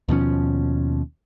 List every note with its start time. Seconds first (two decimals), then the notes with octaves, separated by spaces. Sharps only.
0.09 D#2 B2 F3 C#4